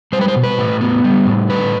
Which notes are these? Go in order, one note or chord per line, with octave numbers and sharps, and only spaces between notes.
G3 C5
B4
C5
B2
B4
A2
B3
G3
A2
D3 B4